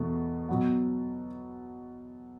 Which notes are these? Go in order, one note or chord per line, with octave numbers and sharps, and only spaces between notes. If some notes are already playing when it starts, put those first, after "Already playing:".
Already playing: E2 B2 A3
B2 F#3 B3 F#5